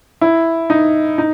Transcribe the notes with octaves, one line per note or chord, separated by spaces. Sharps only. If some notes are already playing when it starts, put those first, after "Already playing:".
E4
D#4
D#4